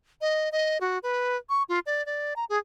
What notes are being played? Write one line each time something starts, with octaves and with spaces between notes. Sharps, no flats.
D#5
D#5
F#4
B4
C#6
F4
D5
D5
A#5
G#4